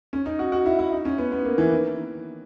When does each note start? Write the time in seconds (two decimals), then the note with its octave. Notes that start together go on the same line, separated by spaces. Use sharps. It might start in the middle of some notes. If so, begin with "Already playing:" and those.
0.13 C#4
0.26 D#4
0.39 F#4
0.52 F#4
0.66 E4
0.79 E4
0.92 D#4
1.05 C#4
1.18 B3
1.32 B3
1.45 A#3
1.58 E3
1.71 D#3